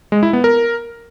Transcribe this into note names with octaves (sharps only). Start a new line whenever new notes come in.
G#3
E4
B3
A#4